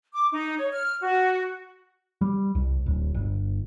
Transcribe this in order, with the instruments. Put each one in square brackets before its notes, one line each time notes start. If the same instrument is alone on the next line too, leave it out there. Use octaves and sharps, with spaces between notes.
[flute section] D6
D#4
C#5
F6
F#4
[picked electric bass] G3
C2
D1
G1